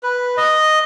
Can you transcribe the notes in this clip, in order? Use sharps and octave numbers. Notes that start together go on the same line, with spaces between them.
B4
D#5